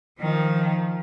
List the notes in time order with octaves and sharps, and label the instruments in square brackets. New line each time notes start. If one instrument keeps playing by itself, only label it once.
[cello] D#3 F3